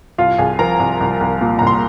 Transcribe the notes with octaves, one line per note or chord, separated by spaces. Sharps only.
C2 F4 F5
C2 G#4 G#5
F3 A#4 A#5
C2
C2
C2
A#2
C2 A#5
C6